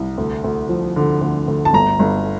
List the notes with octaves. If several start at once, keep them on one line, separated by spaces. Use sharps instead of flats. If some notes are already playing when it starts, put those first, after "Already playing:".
Already playing: C2
D2
D2
F3
D3
D2
D2
A5
G1 A#5
G1